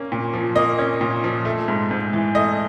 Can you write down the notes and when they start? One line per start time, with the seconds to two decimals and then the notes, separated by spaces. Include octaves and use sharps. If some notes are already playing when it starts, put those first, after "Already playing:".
Already playing: A#3 C#4
0.12 A#2
0.34 F3
0.56 A#3 D#5
0.79 C#4
1.01 A#2
1.24 F3
1.45 A3
1.68 G#2
1.91 G#2
2.13 E3
2.35 A3 D#5